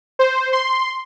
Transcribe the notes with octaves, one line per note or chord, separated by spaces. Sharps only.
C5
C6